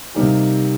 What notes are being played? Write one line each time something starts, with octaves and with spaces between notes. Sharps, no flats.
C3 G3 A#3 D#4 G4